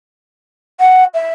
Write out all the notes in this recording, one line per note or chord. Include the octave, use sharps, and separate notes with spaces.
F#5
E5